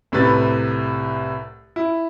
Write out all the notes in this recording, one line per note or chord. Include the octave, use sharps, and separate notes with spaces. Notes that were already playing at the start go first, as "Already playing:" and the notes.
C2 A2 C3 B4 A6
E4